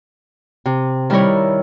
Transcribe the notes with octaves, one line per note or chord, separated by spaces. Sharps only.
C3
D#3 G3 D#4 E4 A#4 C#5